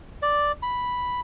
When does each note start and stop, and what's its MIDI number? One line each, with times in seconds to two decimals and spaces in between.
0.22 0.52 74
0.63 1.21 83